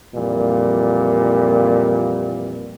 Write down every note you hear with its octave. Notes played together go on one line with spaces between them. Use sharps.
F2 A#2 E3 G3